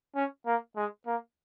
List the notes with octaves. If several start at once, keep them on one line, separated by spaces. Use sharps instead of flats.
C#4
A#3
G#3
A#3